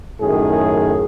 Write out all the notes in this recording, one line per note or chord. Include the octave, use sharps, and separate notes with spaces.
F#2 A2 D#3 G#4